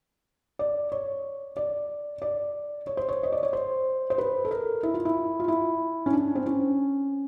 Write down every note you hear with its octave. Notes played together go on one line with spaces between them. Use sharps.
D5
C#5
D5
D5
C#5
C5
C#5
D#5
D5
C#5
C5
C5
B4
A4
A#4
E4
F4
E4
F4
E4
C#4
D4
C4
C#4